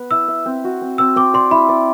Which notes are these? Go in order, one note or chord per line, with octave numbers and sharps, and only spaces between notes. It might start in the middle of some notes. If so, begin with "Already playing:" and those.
Already playing: B3 B4
E4 E6
E5
C4
F#4
C4
C4 E6
C4 D6
D5 C6
E4 B5
D5